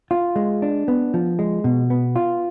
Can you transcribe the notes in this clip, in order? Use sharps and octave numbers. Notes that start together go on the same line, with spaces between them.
F4
G#3
D4
B3
F3
G#3
B2
B3
F4